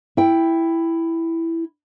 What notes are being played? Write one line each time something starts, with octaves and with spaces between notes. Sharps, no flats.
E4 G5